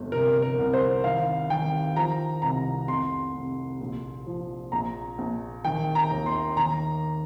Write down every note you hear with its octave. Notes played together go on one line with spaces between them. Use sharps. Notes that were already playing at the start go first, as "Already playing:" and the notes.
Already playing: G1 F2
C3 A#4
A#4
C2
C5
D#3 F5
D#3 G5
F3 A#5
C2 A#5
F1 C6
F1
A#1
F3
A#1 A#5
A#1
D#3 G5
A#5
D#2
C6
D#3 A#5